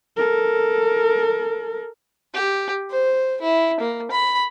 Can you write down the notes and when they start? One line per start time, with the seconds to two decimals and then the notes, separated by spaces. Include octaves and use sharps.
0.17 A4 A#4
2.34 G4
2.90 C5
3.41 E4
3.80 A#3
4.11 B5